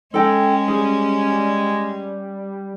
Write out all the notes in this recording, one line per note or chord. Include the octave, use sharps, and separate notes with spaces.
G#3 C#4 A4 G5
G3 G#4
G3